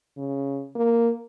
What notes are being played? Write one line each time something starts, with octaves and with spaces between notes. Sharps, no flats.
C#3
A#3